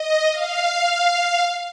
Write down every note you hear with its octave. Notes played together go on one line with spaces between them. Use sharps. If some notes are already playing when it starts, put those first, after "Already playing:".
Already playing: D#5
F5